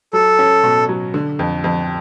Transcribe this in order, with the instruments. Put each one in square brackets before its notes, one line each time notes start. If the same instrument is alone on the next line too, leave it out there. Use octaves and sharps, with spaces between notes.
[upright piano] F#3 [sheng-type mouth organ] A4
[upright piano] C#4
B2
F#3
D3
F2
F2